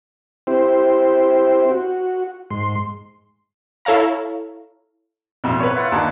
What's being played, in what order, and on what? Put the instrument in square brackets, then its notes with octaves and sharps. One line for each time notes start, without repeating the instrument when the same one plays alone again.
[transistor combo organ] C4 E4 G4 C5
F#4
G#2 C6
[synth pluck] E4 A4 C#5 F5 A#5
[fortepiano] A1 F2 B2
B4 C#5
[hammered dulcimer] E4 F4 F#5
[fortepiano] D#2 [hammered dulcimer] D4 C#5 G5